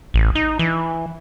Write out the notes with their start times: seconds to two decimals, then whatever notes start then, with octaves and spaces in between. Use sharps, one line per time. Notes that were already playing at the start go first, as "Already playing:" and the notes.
0.14 A1
0.35 D#4
0.59 E3